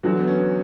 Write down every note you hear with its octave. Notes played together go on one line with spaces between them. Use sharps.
E2 D3 F#3 F#4
B3
C#4